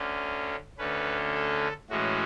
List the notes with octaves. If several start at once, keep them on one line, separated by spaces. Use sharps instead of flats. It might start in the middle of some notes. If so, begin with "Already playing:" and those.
Already playing: D2 D3 A3 C#4
D2 D3 A3 C#4 B4
A4
A2 E3 G#3 C#4 F#4